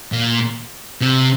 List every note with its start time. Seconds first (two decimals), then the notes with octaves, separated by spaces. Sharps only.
0.12 A#2
1.01 C3